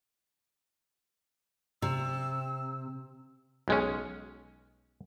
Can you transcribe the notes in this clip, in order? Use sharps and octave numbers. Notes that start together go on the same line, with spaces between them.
C3 E6
B1 G#3 C#4